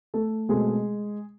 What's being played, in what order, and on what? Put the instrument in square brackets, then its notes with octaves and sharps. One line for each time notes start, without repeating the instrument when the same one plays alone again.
[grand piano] A3 A4
B2 G#3 A3 C4 G#4